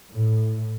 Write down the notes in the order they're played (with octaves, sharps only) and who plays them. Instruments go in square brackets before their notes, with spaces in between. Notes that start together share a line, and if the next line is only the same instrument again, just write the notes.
[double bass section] A2